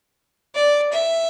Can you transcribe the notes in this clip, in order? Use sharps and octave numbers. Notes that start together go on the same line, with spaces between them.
D5
E5